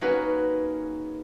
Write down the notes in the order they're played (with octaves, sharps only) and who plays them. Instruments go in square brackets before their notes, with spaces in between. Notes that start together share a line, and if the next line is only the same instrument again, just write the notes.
[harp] A#3 C#4 D#4 F#4 G#4 B4